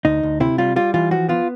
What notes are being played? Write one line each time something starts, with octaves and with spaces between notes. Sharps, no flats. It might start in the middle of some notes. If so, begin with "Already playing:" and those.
D2 D#4
D2
C3 E4
G3 F4
G3 F4
E3 F4
F3 F#4
B3 F4